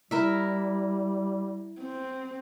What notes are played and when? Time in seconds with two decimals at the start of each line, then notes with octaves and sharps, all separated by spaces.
0.11 G3 E4 A#4 E5
1.81 C4